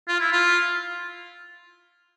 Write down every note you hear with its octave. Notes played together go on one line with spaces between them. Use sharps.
F4
E4
F4